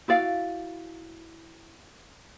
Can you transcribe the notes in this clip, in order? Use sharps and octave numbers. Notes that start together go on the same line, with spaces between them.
E4 F#4 D5 F5